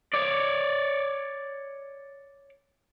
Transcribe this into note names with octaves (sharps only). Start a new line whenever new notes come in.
C#5 D5